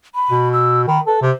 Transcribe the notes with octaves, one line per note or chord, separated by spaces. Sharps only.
B5
B2
E6
D#3 B5
A4 B4
C3 C5